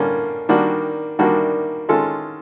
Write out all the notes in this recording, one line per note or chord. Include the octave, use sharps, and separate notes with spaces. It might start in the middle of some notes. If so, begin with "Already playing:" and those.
Already playing: D3 G3 A#3 C#4 F4
D#3 G3 A#3 D4 F#4
D#3 G3 A#3 D4 F#4
D#3 G#3 C#4 F4 A4